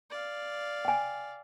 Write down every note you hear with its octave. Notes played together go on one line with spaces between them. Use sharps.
D5 F5
G5 G#5